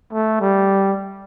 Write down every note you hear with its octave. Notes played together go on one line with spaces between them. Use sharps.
A3
G3